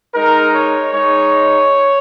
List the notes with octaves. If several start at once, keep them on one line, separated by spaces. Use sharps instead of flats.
G#3 D#4 A#4
C#5
G#3 D#4 C#5